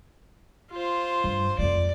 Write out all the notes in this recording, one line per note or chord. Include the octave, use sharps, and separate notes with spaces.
F4 C5
G2
F2 G#3 D5